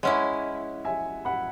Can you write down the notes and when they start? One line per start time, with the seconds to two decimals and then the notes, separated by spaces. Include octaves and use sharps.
0.03 G#3 C#4 E4 C#5 F#5
0.85 E5 G#5
1.25 F#5 B5